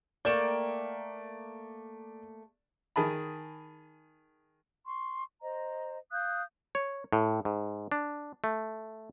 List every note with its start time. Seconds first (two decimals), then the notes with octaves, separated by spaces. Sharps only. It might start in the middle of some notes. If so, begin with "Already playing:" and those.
0.25 A3 A#3 D5 G5 E7
2.96 D#3 G#4 A5 B5
4.86 C6 C#6
5.42 C5 D#5 A#5
6.11 F5 D#6 F#6 G6
6.75 C#5
7.13 A2
7.45 G#2
7.92 D4
8.44 A3